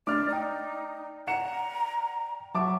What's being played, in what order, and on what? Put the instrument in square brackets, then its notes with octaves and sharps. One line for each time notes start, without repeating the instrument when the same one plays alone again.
[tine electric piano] A3 D4 [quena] D5 [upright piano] D6 F6
[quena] D#4 [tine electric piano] D5 G5
[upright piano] F#5 C#7 E7 [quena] A#5
[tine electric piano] F#3 E5 F#5 [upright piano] A5 D6 [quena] C#6